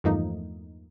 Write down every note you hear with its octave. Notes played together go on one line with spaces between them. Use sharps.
E2 G2 F3 A3 A#3 D#4